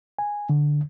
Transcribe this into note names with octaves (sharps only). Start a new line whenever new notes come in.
G#5
D3